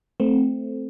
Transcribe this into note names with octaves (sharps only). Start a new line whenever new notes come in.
A3 C4